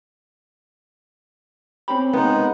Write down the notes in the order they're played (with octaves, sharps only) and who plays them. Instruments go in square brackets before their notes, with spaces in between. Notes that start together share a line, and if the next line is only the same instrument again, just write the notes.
[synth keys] C4 C#4 G4 [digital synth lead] B5
[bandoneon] G#3 D#4 [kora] B3